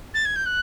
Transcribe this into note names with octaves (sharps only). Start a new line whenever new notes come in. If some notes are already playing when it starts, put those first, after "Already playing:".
A6
G#6
G6
F#6